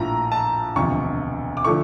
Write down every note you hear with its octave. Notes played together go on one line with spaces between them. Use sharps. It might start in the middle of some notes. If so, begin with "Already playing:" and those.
Already playing: A#1 A2 F3 A#5
A5
E1 D2 C3 F3 C#6
D6
D3 F3 A3 C#6